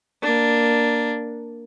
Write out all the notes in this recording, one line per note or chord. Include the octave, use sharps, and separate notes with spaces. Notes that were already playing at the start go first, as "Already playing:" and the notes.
A#3 D4